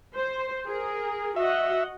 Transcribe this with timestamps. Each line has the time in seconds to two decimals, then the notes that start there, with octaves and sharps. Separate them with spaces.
0.15 C5
0.67 G#4 A#4
1.36 F#4 D#5 E5 F#5